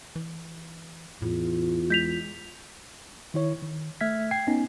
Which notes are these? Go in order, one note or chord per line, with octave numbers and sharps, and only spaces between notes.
E3
E2 A2 F4
G#3 G6 B6 F7
D#3 E4 C#5
D#3
A3 E5 F6 G#6 B6
G5 G#6 C7
B3 C#4 D#4 G#5